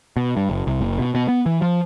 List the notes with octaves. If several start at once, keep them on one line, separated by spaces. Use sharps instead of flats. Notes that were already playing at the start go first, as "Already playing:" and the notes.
B2
G2
F#1
C2
F#1
B2
B2
B3
E3
F3